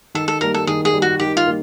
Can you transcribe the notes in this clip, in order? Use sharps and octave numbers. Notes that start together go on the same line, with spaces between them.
D#3 A4
A4
G3 A#3 A#4
A4
D#3 G#4
G#4
G3 A#3
F#4
D#3 G4
F4
G3 A#3